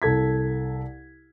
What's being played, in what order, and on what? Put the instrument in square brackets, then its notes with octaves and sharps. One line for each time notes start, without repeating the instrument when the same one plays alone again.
[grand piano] C2 A4 G#6 B6